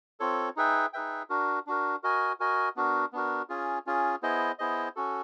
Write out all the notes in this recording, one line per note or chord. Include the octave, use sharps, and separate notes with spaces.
C4 F4 A4 C#5
D#4 G#4 B4 E5 G5
D#4 G#4 B4 E5 G5
D4 F#4 A#4
D4 F#4 A#4
F#4 A#4 D#5 G#5
F#4 A#4 D#5 G#5
B3 D4 F#4 A#4
B3 D4 F#4 A#4
C#4 F4 G#4
C#4 F4 G#4
B3 E4 G#4 C5 D#5
B3 E4 G#4 C5 D#5
C#4 F#4 A4